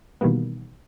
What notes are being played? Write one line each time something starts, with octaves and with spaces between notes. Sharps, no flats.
B2 D#3 E3 G3 A#3 B3